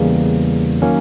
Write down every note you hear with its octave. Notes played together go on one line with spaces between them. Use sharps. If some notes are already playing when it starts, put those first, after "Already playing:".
Already playing: E2 C#3 E3 G3 A#3
D#3 F#3 A#3 C#4